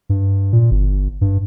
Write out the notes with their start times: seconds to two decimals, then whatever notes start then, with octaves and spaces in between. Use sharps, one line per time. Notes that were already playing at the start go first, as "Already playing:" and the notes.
0.09 G2
0.52 A#2
0.71 G1
1.21 G2